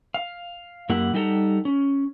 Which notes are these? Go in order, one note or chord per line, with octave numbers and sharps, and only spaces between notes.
F5
F#2 A#3 E4 G4 F#5
G3 D#4 G4 A4 F#5 A#5
C#4